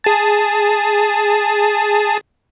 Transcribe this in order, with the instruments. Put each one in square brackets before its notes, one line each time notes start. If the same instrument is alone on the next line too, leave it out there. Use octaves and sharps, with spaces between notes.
[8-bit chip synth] G#4 A5